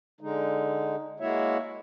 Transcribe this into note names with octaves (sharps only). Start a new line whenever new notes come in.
D3 G#3 D#4
G#3 A#3 E4 F#4 C#5 E5